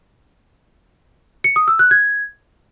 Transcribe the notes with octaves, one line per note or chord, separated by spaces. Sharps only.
C#7
D#6
E6
F#6
G#6